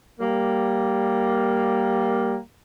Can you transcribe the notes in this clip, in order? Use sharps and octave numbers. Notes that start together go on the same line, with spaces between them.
G3 A#3